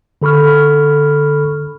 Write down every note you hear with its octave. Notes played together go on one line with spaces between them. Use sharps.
D3 A4 B5 C#6 F6